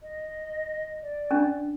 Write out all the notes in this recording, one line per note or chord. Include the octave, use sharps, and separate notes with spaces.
D#5
D5
C#4 D4